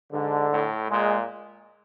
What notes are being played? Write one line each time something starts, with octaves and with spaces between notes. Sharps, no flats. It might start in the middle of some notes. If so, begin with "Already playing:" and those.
G#2 D3
A2
A#2 G#3